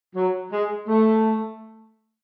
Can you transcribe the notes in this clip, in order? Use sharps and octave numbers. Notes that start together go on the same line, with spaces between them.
F#3
G#3
A3